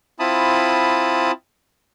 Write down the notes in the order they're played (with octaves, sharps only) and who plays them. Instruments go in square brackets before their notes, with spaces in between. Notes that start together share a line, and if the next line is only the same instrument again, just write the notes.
[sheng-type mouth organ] C4 E4 F4 A5 B5 D#6